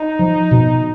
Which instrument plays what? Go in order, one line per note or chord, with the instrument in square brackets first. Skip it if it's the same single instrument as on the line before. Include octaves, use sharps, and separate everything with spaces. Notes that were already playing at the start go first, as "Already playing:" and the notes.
Already playing: [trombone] D#4
[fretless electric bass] F3
B2